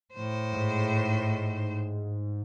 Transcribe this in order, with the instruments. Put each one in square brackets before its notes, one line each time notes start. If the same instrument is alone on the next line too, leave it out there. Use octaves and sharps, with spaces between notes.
[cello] A2 C5
[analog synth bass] G#2